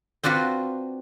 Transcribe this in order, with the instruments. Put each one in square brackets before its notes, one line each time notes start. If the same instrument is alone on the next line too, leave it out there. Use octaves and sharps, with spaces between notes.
[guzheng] C4 D4 F4 F#4 B4